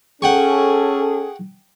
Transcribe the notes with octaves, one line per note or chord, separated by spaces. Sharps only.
C#4 G#4 A4 F#5 G5 C#6